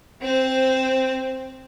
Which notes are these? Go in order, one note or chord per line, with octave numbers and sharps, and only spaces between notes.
C4 C5